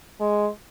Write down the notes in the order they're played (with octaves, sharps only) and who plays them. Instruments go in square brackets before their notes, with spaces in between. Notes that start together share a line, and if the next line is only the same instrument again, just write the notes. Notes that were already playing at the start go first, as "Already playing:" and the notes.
[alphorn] G#3